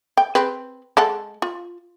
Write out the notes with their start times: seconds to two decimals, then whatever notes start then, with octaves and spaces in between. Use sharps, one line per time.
0.17 G5
0.35 C4 G#4 B4
0.97 G#3 A4 F#5
1.42 F4